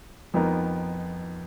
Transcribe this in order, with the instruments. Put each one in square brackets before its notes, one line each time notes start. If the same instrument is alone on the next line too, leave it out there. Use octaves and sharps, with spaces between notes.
[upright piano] F2 F3 B3 D#4 A#4